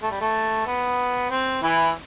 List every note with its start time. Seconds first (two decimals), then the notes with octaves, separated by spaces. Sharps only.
0.02 A3
0.11 G3
0.21 A3
0.67 B3
1.30 C4
1.63 E3 E4